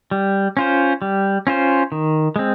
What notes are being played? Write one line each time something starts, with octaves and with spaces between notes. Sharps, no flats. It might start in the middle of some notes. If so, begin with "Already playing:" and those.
G3
C#4 F4 C5
G3
C#4 F4 C5
D#3
G#3 C4